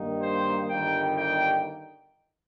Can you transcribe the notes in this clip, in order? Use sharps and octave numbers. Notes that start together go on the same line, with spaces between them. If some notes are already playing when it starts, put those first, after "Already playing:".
Already playing: G2 D#3 A#3 D#4
C5
G1 G2 D#3 G3 D#4 G5
G5